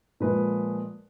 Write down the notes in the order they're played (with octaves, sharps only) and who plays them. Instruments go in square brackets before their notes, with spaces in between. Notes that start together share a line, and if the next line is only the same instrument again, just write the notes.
[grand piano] A#2 F3 G#3 B4